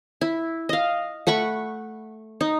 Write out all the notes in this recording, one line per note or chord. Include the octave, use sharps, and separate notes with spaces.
E4
D#5 F5
A3 F#5 B5 C#6
D#4